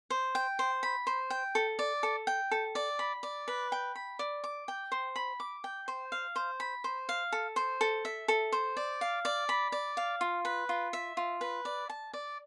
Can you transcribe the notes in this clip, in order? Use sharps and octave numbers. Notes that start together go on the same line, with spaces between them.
C5
G5
C5
B5
C5
G5
A4
D5
A4
G5
A4
D5
B5
D5
B4
G5
B5
D5
D6
G5
C5
B5
D6
G5
C5
F5
C5
B5
C5
F5
A4
C5
A4
E5
A4
C5
D5
F5
D5
B5
D5
F5
F4
B4
F4
E5
F4
B4
D5
A5
D5